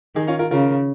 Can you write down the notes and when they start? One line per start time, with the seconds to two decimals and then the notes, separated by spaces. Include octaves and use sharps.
0.15 D#3 D#4 G#4
0.27 C#4 F4
0.39 F4 A#4
0.51 C#3 F4 A#4